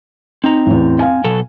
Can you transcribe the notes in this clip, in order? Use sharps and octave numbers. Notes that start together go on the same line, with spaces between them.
C4 D#4 A#5
A1 E2
F5 G#5
B2 F#3 A4